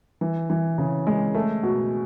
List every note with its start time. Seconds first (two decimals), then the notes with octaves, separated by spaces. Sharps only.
0.21 E3
0.50 E3
0.78 C#3
1.07 G#3
1.34 A3
1.63 B2